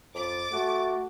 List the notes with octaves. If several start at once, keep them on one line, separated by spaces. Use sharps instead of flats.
F2 D6 A6
A3 F#4